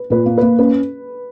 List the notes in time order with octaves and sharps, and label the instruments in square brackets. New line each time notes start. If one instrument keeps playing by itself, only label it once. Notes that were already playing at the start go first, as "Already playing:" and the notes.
Already playing: [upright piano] B4
[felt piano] A#2 [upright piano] B4
[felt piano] A#3
[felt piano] A#3 [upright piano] B4
[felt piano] C#4 [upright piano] B4